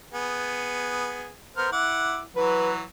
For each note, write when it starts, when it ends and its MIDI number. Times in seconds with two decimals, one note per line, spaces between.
0.14 1.32 59
0.14 1.32 68
1.57 1.68 59
1.57 1.68 70
1.57 1.71 72
1.57 1.68 89
1.72 2.22 64
1.72 2.20 78
1.72 2.20 86
2.36 2.83 52
2.36 2.83 54
2.36 2.73 71